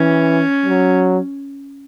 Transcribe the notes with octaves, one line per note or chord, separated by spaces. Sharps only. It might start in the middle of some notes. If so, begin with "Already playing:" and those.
Already playing: E3 C#4
F#3